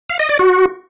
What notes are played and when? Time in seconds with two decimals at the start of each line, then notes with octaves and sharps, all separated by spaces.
0.09 F5
0.19 D#5
0.29 D5
0.39 F#4